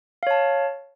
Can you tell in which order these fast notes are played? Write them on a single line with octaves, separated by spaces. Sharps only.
F5 C#5 A5